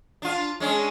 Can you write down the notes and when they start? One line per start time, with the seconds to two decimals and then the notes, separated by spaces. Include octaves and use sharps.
0.22 D4 F4
0.60 G#3 C#4 D4